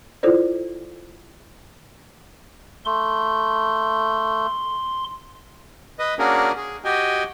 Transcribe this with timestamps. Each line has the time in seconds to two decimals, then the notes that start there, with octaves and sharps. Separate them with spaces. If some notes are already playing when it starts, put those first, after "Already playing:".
0.23 E4 F4 A4 C5 D5
2.85 A3 C6
5.99 B4 D#5
6.19 A#3 C#4 D4 F#4 G#4 A#4
6.56 G#4
6.85 F#4 G4 D#5 G5 G#5